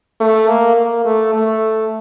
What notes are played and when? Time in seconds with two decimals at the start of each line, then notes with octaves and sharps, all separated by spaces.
0.20 A3
0.48 A#3
0.77 A#3
1.05 A3
1.34 A3